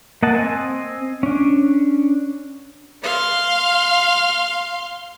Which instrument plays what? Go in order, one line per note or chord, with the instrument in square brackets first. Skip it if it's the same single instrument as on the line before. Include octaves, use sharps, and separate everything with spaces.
[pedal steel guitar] A#3 D#5 F#5 A5
C4 D#5 G#5
C#4 D4
[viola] F5 C6